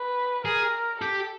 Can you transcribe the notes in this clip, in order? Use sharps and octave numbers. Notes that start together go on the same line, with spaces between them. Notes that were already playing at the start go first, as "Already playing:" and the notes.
Already playing: B4
G#4 A#4
G4 A4